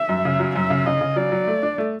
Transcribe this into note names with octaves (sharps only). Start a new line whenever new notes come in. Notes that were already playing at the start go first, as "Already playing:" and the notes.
Already playing: E5
F#2
C#3
F#3
F#2 E5
C#3
C#3 D#5
C#3
F#3 D5
F#3
A3
D4
A3